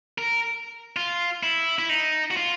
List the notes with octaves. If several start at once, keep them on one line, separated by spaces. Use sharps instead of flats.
A#4
F4
E4
E4
D#4
F#4
F4